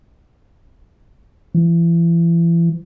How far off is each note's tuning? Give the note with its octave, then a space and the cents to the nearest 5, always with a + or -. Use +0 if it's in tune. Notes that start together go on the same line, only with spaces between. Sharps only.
E3 +35